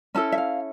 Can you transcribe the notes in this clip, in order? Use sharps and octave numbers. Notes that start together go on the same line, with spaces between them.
C#4 E4 A4 A5
E5
F5